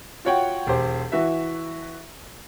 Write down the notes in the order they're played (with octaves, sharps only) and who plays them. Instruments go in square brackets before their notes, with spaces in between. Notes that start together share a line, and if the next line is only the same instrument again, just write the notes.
[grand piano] F4 F#4 C#5 F#5 G5
E1 G4 C5
E3 F#4 E5